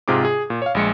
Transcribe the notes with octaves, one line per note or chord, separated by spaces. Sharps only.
G#2 C3 F4 G#4 D6
G#4
A#2
C#5 F5
A#1 G#3 C#7